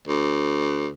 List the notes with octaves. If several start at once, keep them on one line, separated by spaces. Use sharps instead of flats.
D2